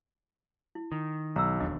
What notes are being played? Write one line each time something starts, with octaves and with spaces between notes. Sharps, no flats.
E4
D#3
B1 A#5 E6
E1 D#2 D4 D#5